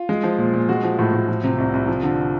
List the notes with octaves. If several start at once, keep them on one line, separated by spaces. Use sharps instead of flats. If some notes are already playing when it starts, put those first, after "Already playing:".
Already playing: F4
G#3
F3
A#2
A#2
G#3 F#4
F3
A2
A2
F3
C3
C2
C2
F3
D3